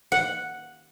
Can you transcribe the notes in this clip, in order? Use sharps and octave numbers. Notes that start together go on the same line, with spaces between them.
F#5